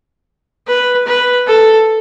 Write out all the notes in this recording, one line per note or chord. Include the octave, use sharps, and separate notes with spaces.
B4
B4
A4